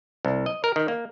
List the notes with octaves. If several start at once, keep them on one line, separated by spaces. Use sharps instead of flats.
C2
D#5
A#4
D#3
A#3